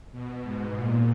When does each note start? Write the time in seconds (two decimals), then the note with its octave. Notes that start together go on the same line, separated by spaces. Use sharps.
0.12 B2
0.43 G#2
0.75 A#2